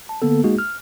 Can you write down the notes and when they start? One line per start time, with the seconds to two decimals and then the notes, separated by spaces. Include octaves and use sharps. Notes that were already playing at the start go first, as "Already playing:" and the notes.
0.09 A5
0.22 D3 A#3 B3 A4
0.44 G#3 A#3 D#4 F#4 G#4
0.59 F6